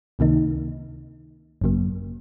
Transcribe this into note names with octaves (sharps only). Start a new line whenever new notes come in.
C#2 C3 D#3 A#3 D#4
G#1 F#2 C#3 F#3 A#3